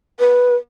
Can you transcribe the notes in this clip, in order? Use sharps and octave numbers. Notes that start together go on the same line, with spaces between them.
B4